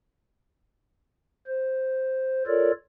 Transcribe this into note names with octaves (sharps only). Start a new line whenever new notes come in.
C5
F4 A4 A#4 C#5 D5